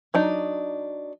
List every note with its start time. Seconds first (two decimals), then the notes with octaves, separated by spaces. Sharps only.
0.14 F#3 D4 D#4